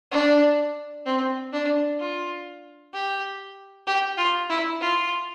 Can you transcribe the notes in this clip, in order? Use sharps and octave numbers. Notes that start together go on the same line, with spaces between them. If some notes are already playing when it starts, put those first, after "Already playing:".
D4
C4
D4
F4
G4
G4
F4
E4
F4